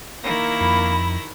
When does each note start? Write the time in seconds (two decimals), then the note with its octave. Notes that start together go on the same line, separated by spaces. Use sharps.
0.24 D#3 A#3 E4 A#6
0.61 F2 B5